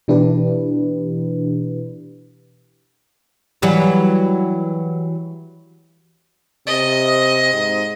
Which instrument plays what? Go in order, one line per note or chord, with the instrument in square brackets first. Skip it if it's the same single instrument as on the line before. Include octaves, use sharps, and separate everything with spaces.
[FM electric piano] B2 E3 D4 E4 G4 B4
[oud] E3 F#3 G3
[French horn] C3 [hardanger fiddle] D#5
[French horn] G#2